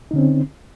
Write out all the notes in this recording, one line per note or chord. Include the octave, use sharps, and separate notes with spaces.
D3 C4 C#4 D#4